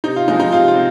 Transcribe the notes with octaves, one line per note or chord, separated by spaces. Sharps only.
C3 D#4
F4
F3 G#3 C4 D#4
D#4
C3 F4
F4
C4